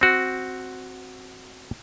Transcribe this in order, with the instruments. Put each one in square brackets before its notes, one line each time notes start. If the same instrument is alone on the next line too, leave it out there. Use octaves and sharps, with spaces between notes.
[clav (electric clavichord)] C4 F#4